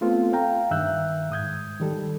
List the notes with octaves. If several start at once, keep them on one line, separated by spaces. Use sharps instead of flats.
A3 B3 C4 F4 A4
F5 G5 A#5
G2 D#3 E5 E6 F#6 G6
G#2 D#6 G6 G#6
D#3 G3 A4